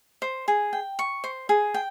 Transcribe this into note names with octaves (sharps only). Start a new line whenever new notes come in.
C5
G#4
G5
C#6
C5
G#4
G5